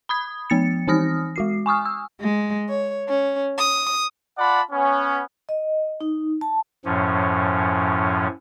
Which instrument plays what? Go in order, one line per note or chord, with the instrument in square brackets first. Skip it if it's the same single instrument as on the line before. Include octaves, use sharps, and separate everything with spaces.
[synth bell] B5 D#6 G#6
F3 B3 A6 C#7
E3 C4 D#4 D#6 F6 A#6
G#3 F#4 C7
G#5 C#6 D#6 F6
E6
[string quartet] G#3
C#5
C#4
D#6
[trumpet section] F4 D5 F#5 A5 B5
B3 C#4
[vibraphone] D#5
D#4
A5
[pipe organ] F#2 A2 F3 C#4